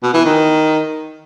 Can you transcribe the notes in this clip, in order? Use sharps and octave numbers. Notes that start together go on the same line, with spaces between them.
B2
E3
D#3